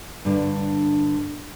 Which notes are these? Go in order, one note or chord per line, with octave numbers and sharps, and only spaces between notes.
G2 D3